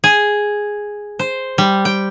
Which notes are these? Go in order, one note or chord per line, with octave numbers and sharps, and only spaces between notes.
G#4
C5
G3
G5